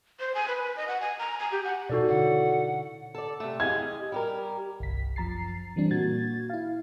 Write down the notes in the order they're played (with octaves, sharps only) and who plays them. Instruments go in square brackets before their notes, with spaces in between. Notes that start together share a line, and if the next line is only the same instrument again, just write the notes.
[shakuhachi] C5
G#5
B4
B4
D#5
F#5
G#5
A#5
G#5
G4
F#5
[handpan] B2 D#4 [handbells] F#4 A4 D5
[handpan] D3 E4 C#5 [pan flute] F#5
[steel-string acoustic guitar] A4 D5
C3 A3
[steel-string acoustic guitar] G4 G#4 D#5 [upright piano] G#6
[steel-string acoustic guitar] G3 G4 A#4
[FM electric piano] G1 C2 B6
F#2 F3 A#5 A6 C7
E3 G3 C4 D4
A#2 A#3 F#4 G#6 A6
E4 F5